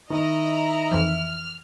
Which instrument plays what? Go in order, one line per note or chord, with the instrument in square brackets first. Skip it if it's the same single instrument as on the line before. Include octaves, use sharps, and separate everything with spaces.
[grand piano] D#3 [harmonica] E4 [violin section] D#5 A#5
[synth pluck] F2 E3 F3 [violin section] F6